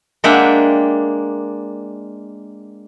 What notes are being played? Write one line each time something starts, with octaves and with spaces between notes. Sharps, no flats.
G#3 A#3 D4 E5 F#5 G5